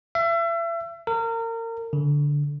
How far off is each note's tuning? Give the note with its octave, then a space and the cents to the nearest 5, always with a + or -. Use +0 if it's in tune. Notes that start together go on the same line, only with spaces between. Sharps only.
E5 +35
A#4 -30
D3 -10